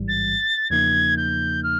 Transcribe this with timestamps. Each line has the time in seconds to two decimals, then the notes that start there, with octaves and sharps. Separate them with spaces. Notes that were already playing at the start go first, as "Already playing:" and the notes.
Already playing: A1 G#2 E3 G3
0.08 A6
0.70 E2 C#3 F3 A#3 D#4 G#6
1.17 G6
1.63 F6